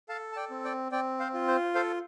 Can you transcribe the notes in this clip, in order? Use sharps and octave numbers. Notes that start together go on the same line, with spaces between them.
A4 F5 A5
A5
D5 G5
C4
D5 G5
C4 D5 G5
C5 F5
F4
C5
A4 C5 F5